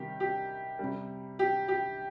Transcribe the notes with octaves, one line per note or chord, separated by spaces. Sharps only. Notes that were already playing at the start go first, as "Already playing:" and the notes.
Already playing: C3 D#3 G3 G4
G4
C3 G3
G4
G4